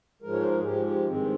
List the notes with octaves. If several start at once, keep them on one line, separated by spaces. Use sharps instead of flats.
G#2 F3 G#3 A#4
C#5
C5
A#4
G#4
G#2 F3 G#3 G4
G4
G2 D#3 G#3 C4